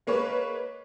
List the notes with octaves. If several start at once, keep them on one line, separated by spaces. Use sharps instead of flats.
G#3 A#3 B4 C#5